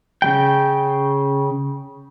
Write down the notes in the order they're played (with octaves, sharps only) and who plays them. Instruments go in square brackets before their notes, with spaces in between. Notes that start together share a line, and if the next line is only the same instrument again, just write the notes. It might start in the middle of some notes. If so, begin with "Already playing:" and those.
[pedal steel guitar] C#3 G3 G5